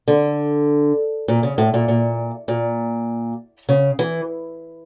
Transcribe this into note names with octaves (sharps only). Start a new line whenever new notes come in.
D3
A#2
C#3
A2
A#2
A#2
A#2
C#3
E3